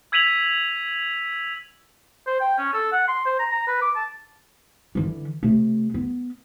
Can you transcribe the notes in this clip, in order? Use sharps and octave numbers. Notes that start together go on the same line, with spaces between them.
E6 G#6 B6 D#7 F7 F#7
C5
G5
C#4
A4
F#5
C6
C5
A#5
A#5
B4
D6
A5
D3 E3
C3 A3
B3